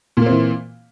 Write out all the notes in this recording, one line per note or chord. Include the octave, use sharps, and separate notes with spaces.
A#2 E3 A#3 C4